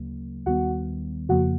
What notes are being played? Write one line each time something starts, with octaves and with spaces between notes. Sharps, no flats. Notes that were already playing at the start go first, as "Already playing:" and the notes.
Already playing: D2 C#3 F#3 A#3
D#2 D#3 G3 B3 F#4 F#5
F2 C#3 F3 A#3 F#4 F#5